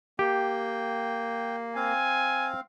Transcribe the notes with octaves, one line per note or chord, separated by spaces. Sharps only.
A#3 G4 G5
C4 F5 G#5